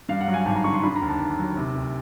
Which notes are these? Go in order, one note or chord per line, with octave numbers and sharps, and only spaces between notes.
G2 F5
F#5
F#3
G#5
G#1 A5
A#5
D3 C#6
C6
D3 B5
A#5
D#2
A5
D#2
F#3
C3
D2